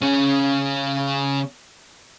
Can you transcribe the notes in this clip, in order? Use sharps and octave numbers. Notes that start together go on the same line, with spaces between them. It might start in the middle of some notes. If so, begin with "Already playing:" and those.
C#3 C#4